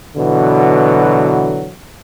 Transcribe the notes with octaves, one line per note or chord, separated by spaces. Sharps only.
B2 D3 E3 F#3